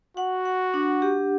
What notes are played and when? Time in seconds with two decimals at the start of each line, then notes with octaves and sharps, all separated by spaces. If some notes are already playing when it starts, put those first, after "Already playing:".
0.17 F#4 F#5
0.45 F#5
0.74 D4
1.02 G4